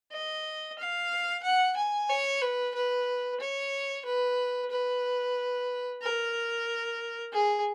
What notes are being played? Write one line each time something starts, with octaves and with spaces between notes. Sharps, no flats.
D#5
F5
F#5
G#5
C#5
B4
B4
C#5
B4
B4
A#4
G#4